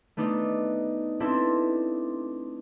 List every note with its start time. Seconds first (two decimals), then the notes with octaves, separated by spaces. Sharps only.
0.17 A3 B3 D4 D#4
1.20 C4 D4 E4 A4 B4